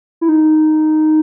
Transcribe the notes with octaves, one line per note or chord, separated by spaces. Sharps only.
E4
D#4